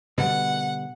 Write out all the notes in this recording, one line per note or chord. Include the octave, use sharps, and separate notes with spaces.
B2 D3 G3 F#5